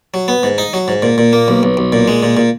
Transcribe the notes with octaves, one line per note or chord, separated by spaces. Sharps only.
F#3
B3
G#2
D#4
F#3
G#2
A#2
A#2
A#3
B1
B1
B1
A#2
G#3
A#2
A#2